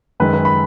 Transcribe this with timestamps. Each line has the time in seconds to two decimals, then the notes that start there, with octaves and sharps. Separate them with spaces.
0.20 F#2 D#3 G#3 B4
0.33 B4
0.45 B5